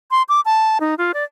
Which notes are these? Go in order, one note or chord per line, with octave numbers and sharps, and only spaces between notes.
C6
D6
A5
D#4
F4
D5